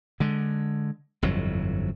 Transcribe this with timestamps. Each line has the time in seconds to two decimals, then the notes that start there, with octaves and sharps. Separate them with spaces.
0.20 D3 G#3
1.22 G1 F2 A2 F#3